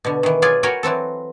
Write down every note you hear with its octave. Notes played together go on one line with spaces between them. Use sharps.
B2 D3
D#3 E3
F#3 F4 G#4 D5 G#5
F#4 A#4 B4 C#5 G5 G#5
E3 F#3 C4 A4